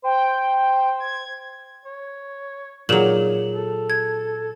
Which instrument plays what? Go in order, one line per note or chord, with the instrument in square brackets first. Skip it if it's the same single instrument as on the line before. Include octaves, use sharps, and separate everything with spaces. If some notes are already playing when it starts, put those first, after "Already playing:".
[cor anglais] C5 [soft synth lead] G5
[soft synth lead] G#6
[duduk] C#5
[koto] A#2 F#3 [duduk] D#4 [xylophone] G#4 E7 F#7
[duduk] A4
[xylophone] G#6